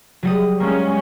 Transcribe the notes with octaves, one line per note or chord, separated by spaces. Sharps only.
F#3 G3 D#6
G#3 A#3 C#4